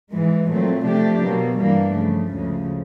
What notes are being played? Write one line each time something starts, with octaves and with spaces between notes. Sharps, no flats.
G#2 E3 G#3
A#2 F#3 A3 C4
C3 F3 A3 D4 G4
B2 F#3 A#3
G2 E3 G3 A#3 D4
C#3 F3 A3
D2 C#3 F3 G#3